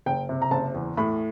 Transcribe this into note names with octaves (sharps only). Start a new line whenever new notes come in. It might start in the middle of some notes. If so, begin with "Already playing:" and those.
F#1 G5
C3
A#5
F#1 A5
E2
A2 B5